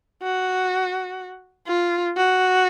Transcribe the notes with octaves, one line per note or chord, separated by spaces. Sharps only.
F#4
F4
F#4